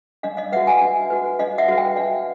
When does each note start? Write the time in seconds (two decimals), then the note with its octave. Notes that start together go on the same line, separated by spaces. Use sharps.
0.23 D4 D#5 F5
0.37 D#5 F5
0.52 F#4 B4 E5 F#5
0.67 F#5 G#5
0.81 D4
1.10 F#4 B4
1.39 D4 D#5 F5
1.58 E5 F#5
1.68 F#4 B4
1.77 F5 G5
1.96 D4 D#5 F5